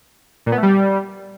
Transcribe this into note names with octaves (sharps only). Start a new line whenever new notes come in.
A#2
B3
A3
G3